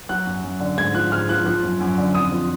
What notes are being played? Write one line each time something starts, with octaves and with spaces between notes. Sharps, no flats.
F#3 F#6
F#2
F#2
D3
G#2 G#6
F3 F#6
G#2 F6
F3 F#6
F3 F#6
F#2
F#2
D3
F2 D#6
F3